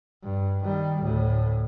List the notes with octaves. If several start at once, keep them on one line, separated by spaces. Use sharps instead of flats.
G2
D#3 G3
D2 A2